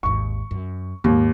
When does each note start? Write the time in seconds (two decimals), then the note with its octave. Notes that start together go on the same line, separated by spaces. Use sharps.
0.03 G#1 D#2 C#6
0.51 F#2
1.04 D#2 G#2